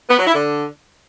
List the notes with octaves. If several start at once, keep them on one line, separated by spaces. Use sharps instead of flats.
B3
F#3
E4
D3